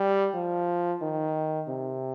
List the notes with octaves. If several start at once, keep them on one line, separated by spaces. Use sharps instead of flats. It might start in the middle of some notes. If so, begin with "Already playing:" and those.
Already playing: G3
F3
D#3
C3